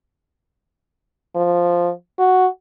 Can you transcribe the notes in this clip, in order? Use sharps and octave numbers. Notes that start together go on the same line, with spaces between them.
F3
F#4